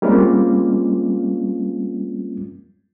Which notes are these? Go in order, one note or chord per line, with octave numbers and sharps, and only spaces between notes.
G3 G#3 A#3 C4 C#4 F4